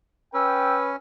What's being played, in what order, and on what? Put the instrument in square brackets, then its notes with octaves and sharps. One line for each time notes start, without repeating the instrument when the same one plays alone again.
[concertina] C#4 [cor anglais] B4 [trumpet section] G5 [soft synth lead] E6